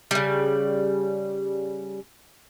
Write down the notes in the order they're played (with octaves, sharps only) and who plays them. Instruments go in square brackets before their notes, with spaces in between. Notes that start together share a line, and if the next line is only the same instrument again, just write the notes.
[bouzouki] C#3 G3